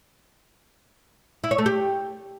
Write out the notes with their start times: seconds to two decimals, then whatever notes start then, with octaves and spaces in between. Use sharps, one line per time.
1.44 E4
1.51 C#5
1.58 A3
1.66 G4